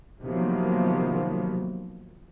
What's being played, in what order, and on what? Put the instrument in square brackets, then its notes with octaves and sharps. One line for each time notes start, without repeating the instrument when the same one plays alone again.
[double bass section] C3 D#3 F3 F#3 A#3 B3